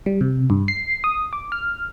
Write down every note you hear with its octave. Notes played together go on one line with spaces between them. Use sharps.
G3
C3
G2
C7
D#6
D6
F6